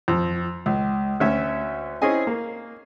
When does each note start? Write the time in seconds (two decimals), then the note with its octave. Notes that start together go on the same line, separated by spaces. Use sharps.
0.08 F2
0.66 C#2
1.20 D2 C#4 E5
2.02 C4 C#4 E4 G#4 D#5 G#5
2.27 A#3